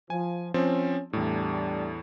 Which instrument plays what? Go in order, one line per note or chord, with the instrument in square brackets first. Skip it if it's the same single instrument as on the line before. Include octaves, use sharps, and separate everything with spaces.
[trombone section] F3 [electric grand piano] G#5
[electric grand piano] F3 C4 [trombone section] C#4
[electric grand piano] E2 A2 [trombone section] G3 A3 D4